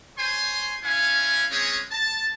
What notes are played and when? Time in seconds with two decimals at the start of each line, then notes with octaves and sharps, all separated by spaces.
0.18 C5 C#5 G#5 C6
0.83 C#4 E4 F5 G#5
1.51 G#3 C4 C#4 G#4 C#5
1.92 A5